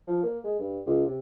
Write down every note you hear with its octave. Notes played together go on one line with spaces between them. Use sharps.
F3
A#3
G#3
G2
C#2
C3